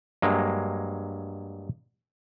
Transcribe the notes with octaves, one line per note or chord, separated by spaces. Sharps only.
G2 F#3 G#3 A#3